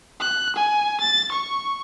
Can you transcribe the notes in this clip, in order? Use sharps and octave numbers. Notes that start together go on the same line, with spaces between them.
F#6
G#5
A6
C#6